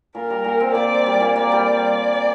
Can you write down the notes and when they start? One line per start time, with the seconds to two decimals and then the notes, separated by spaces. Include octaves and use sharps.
0.15 A#2 A#4
0.30 G3
0.44 A#2
0.60 C4
0.75 A#2 D5
0.91 C4
1.06 G3
1.20 A#2
1.36 A#3 D5
1.52 G3